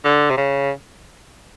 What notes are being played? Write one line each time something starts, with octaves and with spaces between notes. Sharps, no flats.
D3
C3
C#3